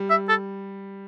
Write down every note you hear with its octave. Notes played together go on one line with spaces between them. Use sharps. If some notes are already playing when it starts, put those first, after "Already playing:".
Already playing: G3
E5
A4